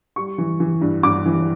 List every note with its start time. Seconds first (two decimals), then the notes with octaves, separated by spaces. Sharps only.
0.16 G3 C#6
0.38 E3
0.60 E3
0.81 G2
1.03 G2 D6
1.26 E3